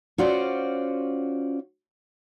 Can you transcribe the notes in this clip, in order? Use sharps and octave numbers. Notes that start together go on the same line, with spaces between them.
C#4 F4 F#4 C5 D5